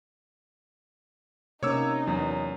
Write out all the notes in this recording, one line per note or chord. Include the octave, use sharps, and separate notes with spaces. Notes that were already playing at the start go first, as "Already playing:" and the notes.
C3 A#3 C#4 D#4 C#5 D6 E6
E2 F#3